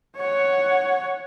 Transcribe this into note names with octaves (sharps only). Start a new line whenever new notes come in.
C#5 F#5